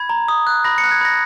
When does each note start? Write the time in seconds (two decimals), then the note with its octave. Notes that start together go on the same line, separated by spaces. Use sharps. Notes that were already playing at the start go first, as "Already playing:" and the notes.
Already playing: B5 G#6
0.09 A#5
0.28 D#6
0.47 F#6
0.64 B5 A#6
0.78 C#7
0.83 F#6
0.91 G#6
1.01 B5 A#6